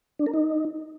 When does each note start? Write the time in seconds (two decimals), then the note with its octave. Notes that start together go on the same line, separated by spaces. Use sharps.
0.19 D4
0.26 A#4
0.34 D#4